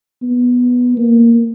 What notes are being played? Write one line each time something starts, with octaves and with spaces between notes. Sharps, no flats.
B3
A#3